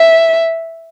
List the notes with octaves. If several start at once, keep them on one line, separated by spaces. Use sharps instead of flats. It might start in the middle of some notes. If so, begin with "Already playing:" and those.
Already playing: E5